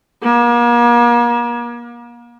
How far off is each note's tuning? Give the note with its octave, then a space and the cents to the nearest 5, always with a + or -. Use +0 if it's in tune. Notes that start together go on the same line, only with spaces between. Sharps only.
A#3 +40